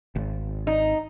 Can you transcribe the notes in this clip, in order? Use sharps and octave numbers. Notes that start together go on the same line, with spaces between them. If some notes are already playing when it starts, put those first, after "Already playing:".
G#1
D#4